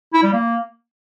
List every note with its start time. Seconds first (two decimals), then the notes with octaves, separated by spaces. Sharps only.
0.14 E4
0.23 G3
0.33 A#3